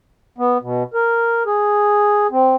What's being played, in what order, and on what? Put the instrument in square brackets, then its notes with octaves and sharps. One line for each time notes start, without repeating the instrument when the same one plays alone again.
[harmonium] B3
B2
A#4
G#4
C4